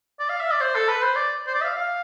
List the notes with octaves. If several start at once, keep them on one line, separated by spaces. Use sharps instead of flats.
D5
F5
E5
D5
C5
A4
B4
C5
D5
C5
D5
E5
F5
F5